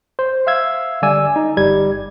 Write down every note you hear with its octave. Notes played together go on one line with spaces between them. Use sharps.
C5
E5 F5 E6 G#6
D3 G3 D5 G#5 E6
D#4
G1 G3 G#6